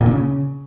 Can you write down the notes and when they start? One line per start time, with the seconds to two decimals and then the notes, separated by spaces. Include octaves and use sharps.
0.01 A#2
0.06 D3
0.11 C#3